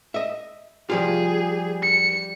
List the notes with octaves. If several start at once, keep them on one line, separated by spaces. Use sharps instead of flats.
D#5 E5
F3 G3 F4 G#4
C#7